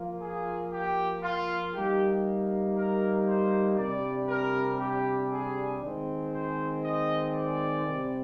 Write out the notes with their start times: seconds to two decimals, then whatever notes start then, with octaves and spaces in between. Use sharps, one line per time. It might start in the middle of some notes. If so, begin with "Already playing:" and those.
Already playing: F3 A#3 F4
0.21 G#4
0.72 G4
1.23 F4
1.74 G3 A#3 D#4 G4
2.75 A#4
3.26 C5
3.77 C3 G3 D4 D5
4.28 A#4
4.79 G4
5.31 G#4
5.82 D#3 G#3 C4
6.32 C5
6.83 D#5
7.34 D5
7.85 C3 G3 C4